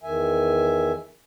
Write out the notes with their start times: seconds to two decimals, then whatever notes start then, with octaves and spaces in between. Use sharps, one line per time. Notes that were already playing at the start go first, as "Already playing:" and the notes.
0.03 E2 D#3 E5 G#5